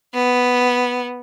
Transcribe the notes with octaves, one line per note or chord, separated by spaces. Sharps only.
B3